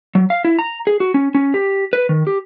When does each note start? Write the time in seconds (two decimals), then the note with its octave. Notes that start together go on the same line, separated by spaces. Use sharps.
0.15 F#3
0.30 F5
0.45 E4
0.59 A#5
0.87 G#4
1.00 F#4
1.14 C#4
1.35 C#4
1.54 G4
1.93 B4
2.09 D#3
2.27 G4